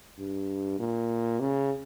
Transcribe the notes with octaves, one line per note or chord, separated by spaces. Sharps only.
G2
A#2
C#3